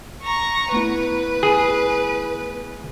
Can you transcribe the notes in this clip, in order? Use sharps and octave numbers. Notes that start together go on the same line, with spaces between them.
A#5 C#6
A3 B3 E4 B4
G#4